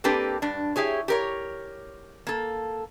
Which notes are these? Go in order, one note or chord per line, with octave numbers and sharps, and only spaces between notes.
A#3 C4 D4 G4 A4 B4
G2 D4
E4 G4 G#4 C#5
G4 A#4 C#5
A#3 A4